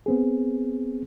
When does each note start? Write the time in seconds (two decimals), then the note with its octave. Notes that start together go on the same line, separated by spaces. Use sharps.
0.06 B3 C4 G#4